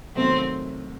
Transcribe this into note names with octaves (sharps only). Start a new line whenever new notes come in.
C3 D#3 F#3 A3 C4